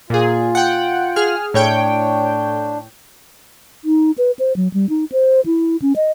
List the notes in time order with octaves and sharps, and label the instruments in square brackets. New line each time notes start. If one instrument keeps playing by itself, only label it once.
[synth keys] A#2 G#4 [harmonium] F4
[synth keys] F#5 G5
G#4 F6
[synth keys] A2 C#5 G5 [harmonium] D4
[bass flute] D#4
B4
C5
F#3
G3
D#4
C5
E4
C#4
D#5